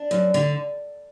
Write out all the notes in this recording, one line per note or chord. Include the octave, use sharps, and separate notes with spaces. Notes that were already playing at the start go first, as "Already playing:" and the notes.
Already playing: D4
F#2
D3